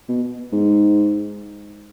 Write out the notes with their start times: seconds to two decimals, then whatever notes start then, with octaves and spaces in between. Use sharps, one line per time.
0.09 B2
0.52 G#2